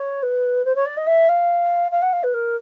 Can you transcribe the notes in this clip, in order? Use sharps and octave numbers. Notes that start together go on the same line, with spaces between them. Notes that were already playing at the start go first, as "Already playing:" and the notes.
Already playing: C#5
B4
C5
C#5
D5
D#5
E5
F5
F5
F#5
F5
B4
A#4